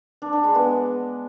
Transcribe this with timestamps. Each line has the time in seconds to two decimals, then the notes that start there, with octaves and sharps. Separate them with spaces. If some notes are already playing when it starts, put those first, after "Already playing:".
0.22 D4
0.33 D4
0.44 G#3
0.55 B3